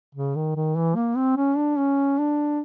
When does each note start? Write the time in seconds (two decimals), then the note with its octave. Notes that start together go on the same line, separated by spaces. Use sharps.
0.15 C#3
0.35 D#3
0.56 D#3
0.76 E3
0.95 A#3
1.16 C4
1.36 C#4
1.57 D4
1.77 C#4
2.18 D4